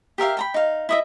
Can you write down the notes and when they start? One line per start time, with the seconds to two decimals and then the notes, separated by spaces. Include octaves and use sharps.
0.18 G4 A#4 E5 F5
0.37 G5 A#5 B5
0.54 D#4 F5
0.89 E4 D#5 E5